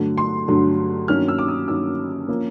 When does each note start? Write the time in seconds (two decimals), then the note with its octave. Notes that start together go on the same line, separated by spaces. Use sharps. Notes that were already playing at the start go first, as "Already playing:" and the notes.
Already playing: G2 D3 F#3 A3
0.18 C6
0.48 G2 D3 F#3 A3
1.08 G2 D#3 F#3 A#3 C#4 F6
1.28 E6
1.38 D6
1.48 D#6
1.68 G2 D#3 F#3 A#3 C#4 E6
2.28 F3 A#3 C#4